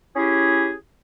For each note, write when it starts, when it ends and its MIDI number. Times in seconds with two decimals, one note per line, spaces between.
0.16 0.72 61
0.16 0.72 64
0.16 0.72 67
0.16 0.72 68